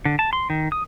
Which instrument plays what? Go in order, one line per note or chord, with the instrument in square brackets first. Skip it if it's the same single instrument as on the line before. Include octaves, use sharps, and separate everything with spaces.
[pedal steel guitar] D3
A5
C6
D#3
D#6